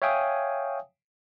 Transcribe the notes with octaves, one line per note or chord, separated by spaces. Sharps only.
C#5 E5 F5 G5 G#5 D#6